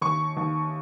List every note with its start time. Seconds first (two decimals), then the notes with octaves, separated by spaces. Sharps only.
0.02 D#2 C#6
0.37 D#2